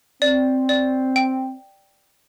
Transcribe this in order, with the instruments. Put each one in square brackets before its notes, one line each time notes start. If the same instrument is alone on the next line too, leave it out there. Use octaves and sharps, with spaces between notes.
[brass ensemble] C4 [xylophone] D5
[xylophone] D5
G5